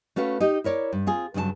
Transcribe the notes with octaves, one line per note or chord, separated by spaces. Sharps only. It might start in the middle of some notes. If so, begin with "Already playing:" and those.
A3 C#4 F#4 B4 F5
D#4 G4 D#5
E4 A#4 C#5 D5
G2
C4 F4 G#4
G2 C#3 F#3 G#4 A5